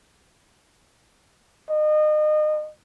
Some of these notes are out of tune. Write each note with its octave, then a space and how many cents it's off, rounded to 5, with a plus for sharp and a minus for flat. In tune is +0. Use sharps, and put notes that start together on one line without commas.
D#5 -30